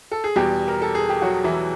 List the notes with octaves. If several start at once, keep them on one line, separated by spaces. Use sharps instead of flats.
A4
G#4
E2 B2 G3 G4
A#4
A4
G#4
G4
F#3 F#4
E3 E4